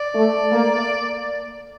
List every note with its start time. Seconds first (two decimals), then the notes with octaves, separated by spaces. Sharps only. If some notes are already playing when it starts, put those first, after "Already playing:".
Already playing: D5
0.15 A3
0.51 A#3